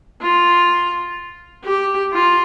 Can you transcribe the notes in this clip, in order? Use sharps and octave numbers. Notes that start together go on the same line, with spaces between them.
F4
G4
F4